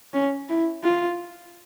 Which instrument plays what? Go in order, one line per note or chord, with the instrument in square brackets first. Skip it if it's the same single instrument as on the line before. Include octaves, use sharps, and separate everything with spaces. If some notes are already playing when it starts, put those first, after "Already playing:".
[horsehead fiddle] C#4
E4
F4